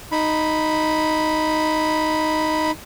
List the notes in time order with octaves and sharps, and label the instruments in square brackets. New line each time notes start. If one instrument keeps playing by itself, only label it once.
[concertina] D#4 B5